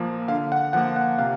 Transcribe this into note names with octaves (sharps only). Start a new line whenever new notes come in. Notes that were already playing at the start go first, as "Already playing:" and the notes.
Already playing: A#2 F3 A#3
D3 F5
F#5
F3 A#3 F#5
F#5
C3 F5